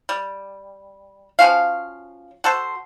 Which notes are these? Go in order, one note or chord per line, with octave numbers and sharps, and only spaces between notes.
G3
F3 C#4 F#4 F5
F#4 A4 C5